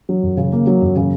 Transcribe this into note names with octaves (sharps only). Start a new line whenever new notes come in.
F#3
F#2
C#3
A#3
F#3
F#2
C#3